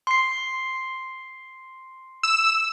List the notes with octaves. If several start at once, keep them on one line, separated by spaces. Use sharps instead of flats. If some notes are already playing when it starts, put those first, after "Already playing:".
C6 C7
E6